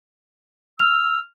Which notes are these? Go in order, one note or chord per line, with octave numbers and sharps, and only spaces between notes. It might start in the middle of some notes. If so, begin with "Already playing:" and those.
E6 F6 F7